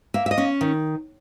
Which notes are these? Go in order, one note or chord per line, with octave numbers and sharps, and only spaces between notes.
A#3 E5
E5
D#5
C#4
D#3